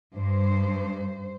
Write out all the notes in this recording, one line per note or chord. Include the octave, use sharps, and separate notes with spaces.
G2 C5